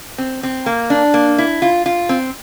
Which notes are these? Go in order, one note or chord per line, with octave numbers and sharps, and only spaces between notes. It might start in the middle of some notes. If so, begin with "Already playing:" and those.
C4
C4
A#3
D4
A#3
E4
F4
F4
C4